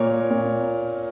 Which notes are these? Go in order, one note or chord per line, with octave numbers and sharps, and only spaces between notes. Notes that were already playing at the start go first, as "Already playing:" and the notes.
Already playing: A#2 A#4 C#5
A#2